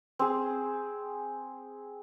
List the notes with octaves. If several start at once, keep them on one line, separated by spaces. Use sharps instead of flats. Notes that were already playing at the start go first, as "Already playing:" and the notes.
C4 G#4